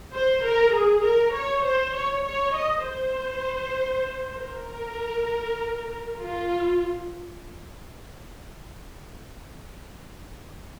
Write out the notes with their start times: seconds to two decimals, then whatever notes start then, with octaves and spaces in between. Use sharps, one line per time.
0.14 C5
0.44 A#4
0.74 G#4
1.05 A#4
1.35 C#5
1.65 C5
1.96 C#5
2.25 C#5
2.56 D#5
2.86 C5
4.38 A#4
6.19 F4